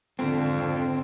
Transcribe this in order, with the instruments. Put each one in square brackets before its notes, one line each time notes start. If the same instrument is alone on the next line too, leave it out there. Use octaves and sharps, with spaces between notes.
[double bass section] G#1 D3 [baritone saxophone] F2 [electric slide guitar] C4